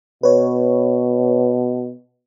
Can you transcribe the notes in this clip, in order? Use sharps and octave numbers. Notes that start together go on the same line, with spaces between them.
B2 B4 C#5